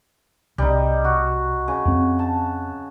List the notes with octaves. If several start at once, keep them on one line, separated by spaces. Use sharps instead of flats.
C2 G3 D#4
F#4
C#3
F2 C4
A5